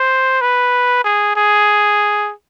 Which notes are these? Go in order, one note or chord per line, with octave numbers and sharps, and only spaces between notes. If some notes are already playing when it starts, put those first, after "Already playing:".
Already playing: C5
B4
G#4
G#4